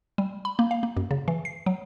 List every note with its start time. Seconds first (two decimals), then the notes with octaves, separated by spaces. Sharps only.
0.18 G3
0.45 B5
0.59 A#3
0.71 F5
0.83 A#3
0.97 F#2
1.11 C#3
1.28 E3
1.45 C7
1.66 F#3